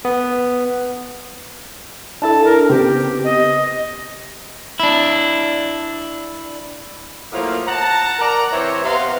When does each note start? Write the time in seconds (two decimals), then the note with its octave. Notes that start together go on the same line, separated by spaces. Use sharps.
0.05 B3
2.22 D4 E4 A4 A5
2.44 A#4
2.69 C#3 B3 C4 G4
3.24 D#5
4.80 D4 E4
7.32 A2 F3 F#3 A#3
7.67 F#5 A5 A#5
8.19 A#4 D5 F#5 A#5
8.52 E3 C4 G4 C5 C#5
8.84 C3 B3 F5 F#5 A#5 C6